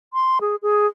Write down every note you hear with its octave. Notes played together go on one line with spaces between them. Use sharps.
C6
G#4
G#4